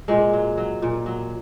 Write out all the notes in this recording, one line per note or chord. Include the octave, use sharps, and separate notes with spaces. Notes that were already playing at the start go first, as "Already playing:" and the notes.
A#2 G#3
F#3
F#3
A#2
F#3